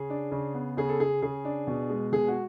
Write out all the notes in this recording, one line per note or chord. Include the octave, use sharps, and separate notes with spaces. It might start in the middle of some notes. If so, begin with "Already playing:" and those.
Already playing: C#3 G#4
D4
C#3
B3
C#3 G#4
A4
C#3 G#4
C#3 G#4
D4
B2
G#3
B2 G#4
F#4